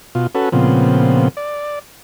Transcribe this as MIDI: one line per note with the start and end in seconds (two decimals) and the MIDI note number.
0.15 0.27 47
0.15 0.27 65
0.35 0.49 61
0.35 0.49 66
0.35 0.49 69
0.35 0.49 71
0.52 1.28 46
0.52 1.28 49
0.52 1.28 53
0.52 1.28 59
0.52 1.28 60
1.37 1.79 74